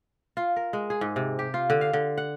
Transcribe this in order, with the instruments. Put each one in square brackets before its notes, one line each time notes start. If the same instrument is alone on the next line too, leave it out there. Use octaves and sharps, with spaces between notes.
[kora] F4
A#4
G#3
G#4
G#2
C3
G4
F4
D3
F5
D3
F#5